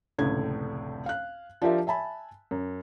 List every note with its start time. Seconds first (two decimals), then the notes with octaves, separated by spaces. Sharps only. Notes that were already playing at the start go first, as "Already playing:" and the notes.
0.18 F1 C#2 A2 D3 G#6
1.06 F5 F#6
1.62 F3 D4 F4 G4 A#4 E5
1.87 E5 G#5 A5 B5
2.51 F#2